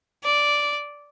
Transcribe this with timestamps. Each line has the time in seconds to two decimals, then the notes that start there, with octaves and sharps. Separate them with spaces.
0.24 D5